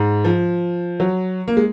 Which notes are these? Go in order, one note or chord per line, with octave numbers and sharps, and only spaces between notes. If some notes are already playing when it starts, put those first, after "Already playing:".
Already playing: G#2
F3
F#3
A#3
G#3